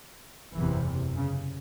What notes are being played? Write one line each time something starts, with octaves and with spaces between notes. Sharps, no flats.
F#1 E2 C3 E3
C#3